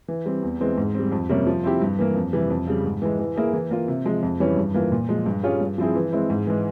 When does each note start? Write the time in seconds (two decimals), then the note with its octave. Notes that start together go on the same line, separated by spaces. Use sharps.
0.08 E3
0.26 G3 C4
0.43 E2
0.61 E3 G#3 C4
0.77 G#2
0.95 G3 C4
1.12 F2
1.29 C3 G3 A#3 C#4
1.47 F3
1.64 C4 E4 G4
1.81 G2
1.99 E3 A#3
2.16 F2
2.33 C3 E3 G3
2.50 F2
2.67 C#3 G3
2.85 G#2
3.02 E3 G#3
3.19 E3
3.36 A#3 E4 G#4
3.53 E3
3.71 A#3 F4
3.88 C3
4.05 F3 G#3
4.23 F2
4.40 E3 G3 C#4 E4
4.57 G2
4.74 E3 A#3 F4
4.92 A#2
5.09 F3 G#3
5.26 G2
5.43 G3 C#4 F4 G#4
5.61 G2
5.78 F3 C4 E4 G#4
5.95 E3
6.13 G#3 C4 E4
6.30 G#2
6.47 E3 G#3